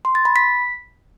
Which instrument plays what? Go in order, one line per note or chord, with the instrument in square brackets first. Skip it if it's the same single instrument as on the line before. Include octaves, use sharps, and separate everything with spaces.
[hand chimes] C6
A6
B5
B6